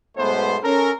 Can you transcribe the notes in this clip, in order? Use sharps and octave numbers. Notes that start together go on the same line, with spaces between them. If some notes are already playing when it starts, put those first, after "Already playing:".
B1 G#2 A3 B3 B4 C5
C#4 A4 A#4